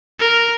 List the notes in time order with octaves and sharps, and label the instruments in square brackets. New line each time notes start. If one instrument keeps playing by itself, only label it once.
[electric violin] A#4